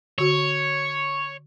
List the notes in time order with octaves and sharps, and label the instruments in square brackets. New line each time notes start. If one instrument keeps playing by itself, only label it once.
[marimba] D3 F#4 [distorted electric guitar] C#5